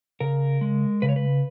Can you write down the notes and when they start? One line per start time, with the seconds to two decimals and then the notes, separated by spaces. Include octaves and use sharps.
0.20 C#3 A#4
0.61 G#3
1.02 C#3 B4
1.09 C#5
1.16 B4